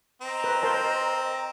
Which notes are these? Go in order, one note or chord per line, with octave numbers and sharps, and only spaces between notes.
C4 D#5 A#5
B4
A#4 C5 A5